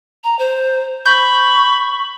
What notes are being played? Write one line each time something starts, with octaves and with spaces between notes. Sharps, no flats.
A#5
C5
B5 C#6 G6